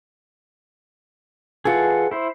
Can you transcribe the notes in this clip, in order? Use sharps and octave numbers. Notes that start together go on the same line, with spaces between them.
E3 F4 G#4 A4 F#5
E4 C5